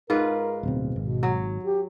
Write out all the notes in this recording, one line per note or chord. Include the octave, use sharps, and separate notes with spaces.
G#2 F4 A#4 B4
D1 B2 C4
G#1 B2
F#3
G4